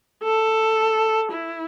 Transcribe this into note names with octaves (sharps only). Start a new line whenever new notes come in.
A4
E4